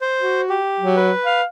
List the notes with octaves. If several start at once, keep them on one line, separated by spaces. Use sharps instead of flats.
C5
F#4
G4
F#3
B4
F5